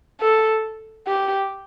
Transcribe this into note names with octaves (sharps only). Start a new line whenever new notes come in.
A4
G4